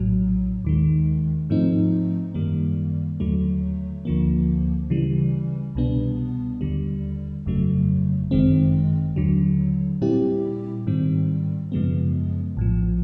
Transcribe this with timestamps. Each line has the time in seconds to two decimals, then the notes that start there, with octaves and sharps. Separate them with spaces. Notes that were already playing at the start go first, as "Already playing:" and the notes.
Already playing: A#1 A2 F#3
0.64 D#2 D#3 G#3
1.50 G#2 F3 A3 C4 D#4
2.34 F#2 D#3 G3 A#3
3.20 D#2 D3 F#3 A3
4.05 D2 D3 F3 A#3
4.90 C#3 E3 G3
5.75 C2 B2 G3 B3 D4
6.61 D#2 D3 G3
7.46 G1 F2 C#3 F#3 A3
8.31 G1 F#2 D#3 G#3 C4
9.16 D#2 D3 F#3
10.02 A#2 G3 C4 E4 G4
10.87 G#2 D#3 G3 C4
11.72 F#2 C#3 F3 G#3 B3
12.57 A#1 A2 F3